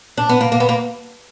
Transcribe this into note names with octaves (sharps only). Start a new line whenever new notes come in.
D4
B3
A#3
A#3
B3
A#3